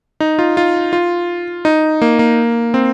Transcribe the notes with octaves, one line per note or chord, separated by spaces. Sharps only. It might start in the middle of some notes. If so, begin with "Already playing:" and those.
D#4
F4
F4
F4
D#4
A#3
A#3
C4